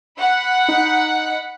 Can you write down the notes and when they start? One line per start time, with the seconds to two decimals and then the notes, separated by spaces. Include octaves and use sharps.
0.19 F#5 B5
0.69 D#4